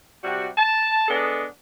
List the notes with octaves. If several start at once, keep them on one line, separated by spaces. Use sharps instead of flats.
C3 G3 F#4
A5
G#3 B3 D4 A4 D#5